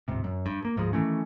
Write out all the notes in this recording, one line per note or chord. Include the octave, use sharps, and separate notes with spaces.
D1 G#2 C3
F#2
G2
A#3
D1 G#2 F3 G#3
D#3 E3 A3 C#4